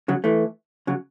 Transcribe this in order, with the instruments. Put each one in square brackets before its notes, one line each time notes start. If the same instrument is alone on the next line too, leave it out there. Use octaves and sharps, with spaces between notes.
[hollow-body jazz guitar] C#3 F#3
E3 A3
C#3 F#3